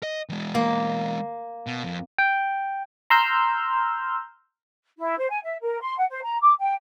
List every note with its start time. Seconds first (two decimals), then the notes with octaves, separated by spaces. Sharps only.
0.03 D#5
0.29 E3 G#3
0.55 A#3
1.67 B2
1.84 F2
2.18 G5
3.10 A#5 C6 E6 F6 G6
4.98 E4
5.17 C5
5.30 G#5
5.43 E5
5.62 A#4
5.80 C6
5.97 F#5
6.09 C5
6.23 A#5
6.41 D6
6.58 G5